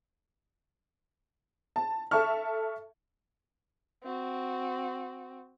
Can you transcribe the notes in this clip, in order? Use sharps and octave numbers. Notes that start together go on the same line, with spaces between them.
A5
A4 E5 A5 C#6 F6
C4 F#4